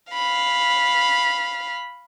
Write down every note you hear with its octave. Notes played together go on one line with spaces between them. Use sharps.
F5 B5